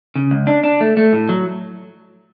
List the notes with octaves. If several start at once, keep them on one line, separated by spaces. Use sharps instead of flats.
C#3
C#2
D4
D4
A3
A3
A2
F#3